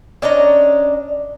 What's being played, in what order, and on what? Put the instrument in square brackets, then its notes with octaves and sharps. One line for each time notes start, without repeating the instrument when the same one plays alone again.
[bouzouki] C#4 D4 D#5 A#5